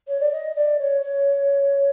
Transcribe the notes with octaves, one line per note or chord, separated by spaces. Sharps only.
C#5
D5
D#5
D5
C#5
C#5